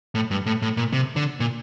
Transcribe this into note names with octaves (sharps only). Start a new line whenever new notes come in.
A2
G2
A2
A2
A#2
C3
D3
A#2